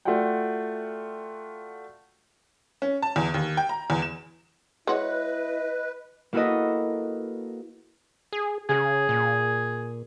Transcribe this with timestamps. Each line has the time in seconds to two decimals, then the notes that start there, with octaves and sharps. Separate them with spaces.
0.05 A3 F4 F#4 D5 F#5 G5
2.82 C#4
3.02 A5
3.16 E2
3.34 D#2
3.57 G5
3.69 A#5
3.90 E2
4.02 E7
4.87 G#3 E4 F#4 B4 C#5 D#5
6.33 A#3 E4 F#4 A4 B4 D#5
8.32 G#4
8.69 C#3 G#4
9.09 A#2